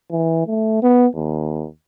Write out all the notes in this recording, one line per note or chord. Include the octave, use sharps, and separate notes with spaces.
E3
A3
B3
D#2